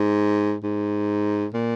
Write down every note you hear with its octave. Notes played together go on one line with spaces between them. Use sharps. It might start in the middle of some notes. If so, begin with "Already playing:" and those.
Already playing: G#2
G#2
A#2